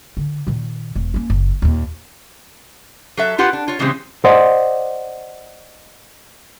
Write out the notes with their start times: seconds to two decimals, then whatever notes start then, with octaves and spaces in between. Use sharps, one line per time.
0.17 D3
0.47 A#2 D#3
0.95 E1
1.14 A#3 C#4
1.30 F#1
1.62 D#2 A#2
3.17 F#3 A4 E5
3.38 E4 F4 G4 B4 F#5
3.53 D4
3.68 F4 C#5
3.79 A#2 C#3 E3 G3 G#3 C4
4.24 C5 D5 D#5 F#5